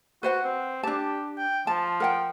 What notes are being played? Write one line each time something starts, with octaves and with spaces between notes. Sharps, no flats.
F#4 B4 C5 F#5
C4
D4 G4 A5
G5
F3 A5
A#4 F#5 G5